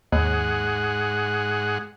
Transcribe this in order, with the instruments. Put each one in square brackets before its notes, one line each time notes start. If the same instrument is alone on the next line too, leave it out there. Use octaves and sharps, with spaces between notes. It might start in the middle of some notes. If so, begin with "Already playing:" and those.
[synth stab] D#2 [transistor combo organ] G#2 G#4 F#5